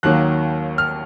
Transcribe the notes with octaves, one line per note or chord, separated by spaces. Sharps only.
D#2 D#3 F#3 A#3 F#6
F6